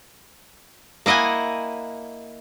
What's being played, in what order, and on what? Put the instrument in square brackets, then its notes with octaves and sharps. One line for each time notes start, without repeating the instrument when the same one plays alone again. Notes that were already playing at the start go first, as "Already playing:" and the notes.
[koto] A#3 E4 D#5 F#5 G#5